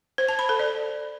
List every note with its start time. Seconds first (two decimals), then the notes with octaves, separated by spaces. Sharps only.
0.18 C5
0.29 A5
0.39 B5
0.49 A4
0.59 D5